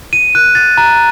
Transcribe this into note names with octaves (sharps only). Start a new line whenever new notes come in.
D#7
F#6
A6
A#5